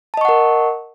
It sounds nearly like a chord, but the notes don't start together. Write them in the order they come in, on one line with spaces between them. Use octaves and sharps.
A5 D#5 C#6 F#5 A#4